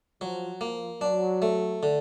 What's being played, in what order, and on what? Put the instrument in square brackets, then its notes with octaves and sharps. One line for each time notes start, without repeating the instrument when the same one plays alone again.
[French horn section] F3 [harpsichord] F#3
[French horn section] F3 [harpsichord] A#3
[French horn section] F#3 [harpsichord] D4
[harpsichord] A3
D3